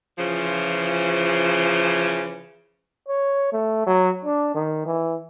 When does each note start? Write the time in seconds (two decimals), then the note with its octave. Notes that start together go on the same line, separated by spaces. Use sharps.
0.18 C#3 E3 F3
3.08 C#5
3.53 A3
3.87 F#3
4.25 D4
4.54 D#3
4.86 E3